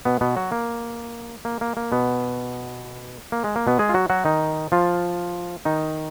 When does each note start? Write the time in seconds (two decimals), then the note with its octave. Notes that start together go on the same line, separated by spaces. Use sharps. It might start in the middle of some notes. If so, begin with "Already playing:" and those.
0.05 B2 B3
0.21 B2 B3
0.36 F#3 F#4
0.52 A#3
1.45 A#3
1.61 A#3
1.77 A#3
1.92 B2 B3
3.32 A#3
3.44 G#3
3.56 A#3
3.67 B2 B3
3.79 G#3 G#4
3.89 F4
3.94 F#3 F#4
4.10 F#3 F#4
4.25 D#3 D#4
4.72 F3 F4
5.65 D#3 D#4